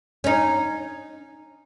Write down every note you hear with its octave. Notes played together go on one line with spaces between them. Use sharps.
C#4 D#4